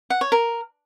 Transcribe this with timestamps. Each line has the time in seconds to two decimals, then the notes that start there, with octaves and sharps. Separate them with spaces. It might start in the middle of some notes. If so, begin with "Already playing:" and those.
0.10 F#5
0.21 C#5
0.32 A#4